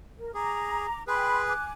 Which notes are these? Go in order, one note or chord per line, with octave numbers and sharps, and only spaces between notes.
A#4
G#4 A#5 D6
G#4 B4 G5 B5 C6
G#5 D6 F#6